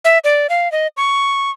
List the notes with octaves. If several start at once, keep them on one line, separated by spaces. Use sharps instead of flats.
E5
D5
F5
D#5
C#6